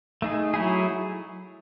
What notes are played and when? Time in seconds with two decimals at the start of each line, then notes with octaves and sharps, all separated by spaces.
0.22 A3 D#4 G#4
0.54 F#3 A3 E4 G#4